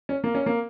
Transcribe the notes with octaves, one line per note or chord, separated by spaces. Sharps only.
C#4
A#3
C#4
A#3